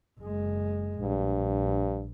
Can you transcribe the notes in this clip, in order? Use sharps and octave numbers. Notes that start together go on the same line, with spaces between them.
F#1 G#3
A#1 G2